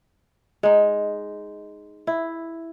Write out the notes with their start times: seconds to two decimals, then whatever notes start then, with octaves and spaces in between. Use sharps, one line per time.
0.63 G#3 D#4
2.07 E4